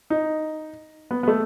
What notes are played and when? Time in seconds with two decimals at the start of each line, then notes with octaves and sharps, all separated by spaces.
0.10 D#4
1.11 B3
1.23 B3
1.28 A3